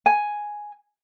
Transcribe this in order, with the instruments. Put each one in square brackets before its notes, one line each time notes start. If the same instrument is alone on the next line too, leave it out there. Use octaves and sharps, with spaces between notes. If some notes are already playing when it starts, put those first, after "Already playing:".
[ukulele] G#5